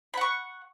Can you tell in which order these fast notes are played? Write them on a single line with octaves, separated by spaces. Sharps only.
B5 F#5 C#6